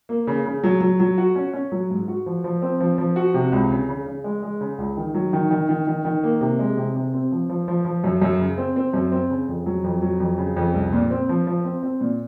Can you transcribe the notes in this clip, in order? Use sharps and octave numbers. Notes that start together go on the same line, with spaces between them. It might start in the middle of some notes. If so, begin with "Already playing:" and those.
A#3
C#3
C#3
F#3
F#3
F#3
F#4
C#4
C#4
F#3
G#2
F#4
F3
F3
C4
F3
F3
F#4
C3
C#2
C#3
C#3
C#3
G#3
G#3
C#3
C#2
D#3
F#3
D#3
D#3
D#3
D#3
D#3
A#3
C3
G#3
C3
C3
C4
F3
F3
F3
F3
F#2
F#2
C#3
C4
C4
F#2
C4
C#3
F2
F#3
F2
F#3
F2
C#3
F2
C2
A#2
C4
F3
F3
C4
C4
A#2